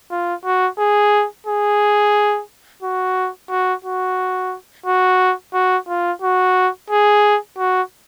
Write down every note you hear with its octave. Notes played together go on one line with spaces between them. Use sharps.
F4
F#4
G#4
G#4
F#4
F#4
F#4
F#4
F#4
F4
F#4
G#4
F#4